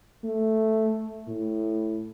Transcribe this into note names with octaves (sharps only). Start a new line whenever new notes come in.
A3
A2